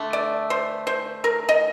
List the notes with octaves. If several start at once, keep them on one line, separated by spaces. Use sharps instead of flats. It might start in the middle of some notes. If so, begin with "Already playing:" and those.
Already playing: D3 A3 D4
D5
C5
C5
A#4
D#5